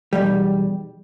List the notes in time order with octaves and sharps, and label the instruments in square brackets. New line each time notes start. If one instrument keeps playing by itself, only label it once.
[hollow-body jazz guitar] B1 E2 G3